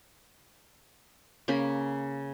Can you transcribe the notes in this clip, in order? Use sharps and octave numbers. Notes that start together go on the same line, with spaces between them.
C#3 A#3 C#4 B5